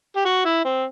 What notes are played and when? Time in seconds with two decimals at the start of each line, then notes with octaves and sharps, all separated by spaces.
0.17 G4
0.25 F#4
0.45 E4
0.65 C4